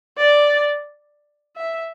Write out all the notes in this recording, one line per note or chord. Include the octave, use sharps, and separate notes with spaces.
D5
E5